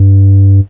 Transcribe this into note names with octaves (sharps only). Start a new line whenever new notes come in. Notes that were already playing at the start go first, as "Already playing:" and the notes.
Already playing: G2